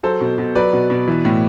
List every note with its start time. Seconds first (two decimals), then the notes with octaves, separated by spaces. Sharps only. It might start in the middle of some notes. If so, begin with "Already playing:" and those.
0.03 F#3 A4 C5
0.21 B2
0.38 B2
0.55 F#3 B4 D5
0.73 B2
0.90 B2
1.08 E3
1.25 A2